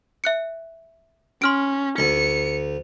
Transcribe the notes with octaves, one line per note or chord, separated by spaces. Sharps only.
E5 F#6 C#7
C#4 C6 F6 D7
D2 C#7